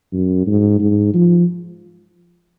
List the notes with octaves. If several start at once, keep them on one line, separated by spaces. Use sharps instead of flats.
F#2
G#2
G#2
F3